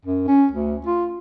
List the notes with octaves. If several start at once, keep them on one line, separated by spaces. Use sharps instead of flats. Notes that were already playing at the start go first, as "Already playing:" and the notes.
F#2
C#4
D2
F4